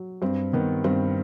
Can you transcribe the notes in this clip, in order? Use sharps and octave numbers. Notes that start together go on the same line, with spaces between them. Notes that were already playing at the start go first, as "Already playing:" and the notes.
Already playing: F#3
G2 C4
D#3 B3
G2 C4